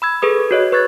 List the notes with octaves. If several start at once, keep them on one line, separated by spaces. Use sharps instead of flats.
B5 E6 G#6
G#4 A4 B4 D#6
F#4 C#5 D#5
B4 C#6 F#6 G#6 A6